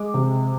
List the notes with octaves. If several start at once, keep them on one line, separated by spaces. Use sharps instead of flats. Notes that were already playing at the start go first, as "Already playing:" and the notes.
Already playing: G#3 D6
C3